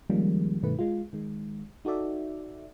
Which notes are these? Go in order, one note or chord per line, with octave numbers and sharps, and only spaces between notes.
D#3 F3 G3 G#3 A#3 C#4
G2 B2 D#3 A3 B4
G#3 F4
D#3 G#3
D#4 F#4 A4 D5 E5